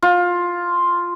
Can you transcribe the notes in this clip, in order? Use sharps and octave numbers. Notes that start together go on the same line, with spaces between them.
F4